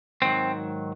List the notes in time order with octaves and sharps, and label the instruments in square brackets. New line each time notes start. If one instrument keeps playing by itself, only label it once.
[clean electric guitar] G#2 D#3 F#3 C4